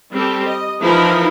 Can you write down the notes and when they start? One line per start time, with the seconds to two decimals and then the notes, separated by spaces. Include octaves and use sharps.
0.12 G3 C4 G4 A4
0.45 D#5
0.81 E3 F3 D#4 E4 A#4 B5